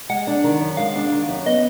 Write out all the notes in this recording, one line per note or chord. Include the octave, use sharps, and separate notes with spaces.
G#3 F#5
D4
D#3
F#2
G#3 F5
D4
D#3
F#2
B3 D#5